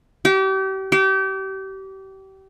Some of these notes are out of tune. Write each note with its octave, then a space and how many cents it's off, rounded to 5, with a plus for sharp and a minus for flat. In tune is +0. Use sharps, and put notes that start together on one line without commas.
G4 -35
G4 -30